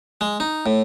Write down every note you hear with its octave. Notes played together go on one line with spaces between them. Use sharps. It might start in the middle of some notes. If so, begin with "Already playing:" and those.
G#3
D#4
A2